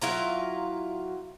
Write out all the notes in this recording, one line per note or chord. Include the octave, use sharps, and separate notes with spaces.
F#3 E4 F4 A#5